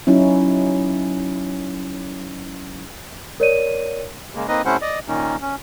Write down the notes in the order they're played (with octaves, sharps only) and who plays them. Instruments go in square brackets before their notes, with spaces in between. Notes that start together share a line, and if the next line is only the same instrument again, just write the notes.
[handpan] F#3 C#4 D#4 E4
[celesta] A#4 C#5 D5 D#7
[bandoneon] C#3 G#3 A#3
A#3 C4 D#4 B4 D#5
C3 A3 C#4 E4 C5 F#5
D5 D#5
A#2 D#3 A#3 C#4 D#4
C#4